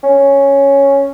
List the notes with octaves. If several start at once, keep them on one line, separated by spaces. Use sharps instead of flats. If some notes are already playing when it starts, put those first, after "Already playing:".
C#4